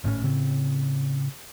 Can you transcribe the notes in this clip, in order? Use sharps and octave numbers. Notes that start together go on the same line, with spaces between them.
G#1 A2 C4 C#4
A2 C#3 C4